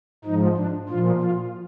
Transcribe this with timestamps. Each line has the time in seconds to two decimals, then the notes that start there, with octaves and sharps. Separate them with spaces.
0.25 G#2 F3 D#4
0.57 D4
0.89 A#2 F3 F4
1.21 F4